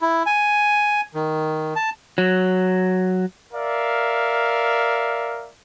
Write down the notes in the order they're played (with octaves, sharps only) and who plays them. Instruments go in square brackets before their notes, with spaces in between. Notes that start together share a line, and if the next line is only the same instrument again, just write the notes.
[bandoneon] E4
G#5
D#3
A5
[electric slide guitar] F#3
[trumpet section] A#4 D5 E5 F5